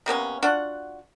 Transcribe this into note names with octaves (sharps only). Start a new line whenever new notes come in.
C3 A#3 B3 C#4
D4 F4 F#4 F#5